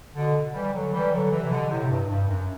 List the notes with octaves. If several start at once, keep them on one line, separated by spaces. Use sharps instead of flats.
B2 D3
E3 G3
D3 F#3
E3 G3
D3 F#3
C3 E3
B2 D3
A2 C3
G2
G2
F#2